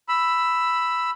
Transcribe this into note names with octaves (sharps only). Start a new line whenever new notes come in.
B5 E6